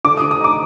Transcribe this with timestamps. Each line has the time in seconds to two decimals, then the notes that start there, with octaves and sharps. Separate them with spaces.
0.05 D3 D6
0.17 D#6
0.22 D3
0.31 D#6
0.40 D#4 D6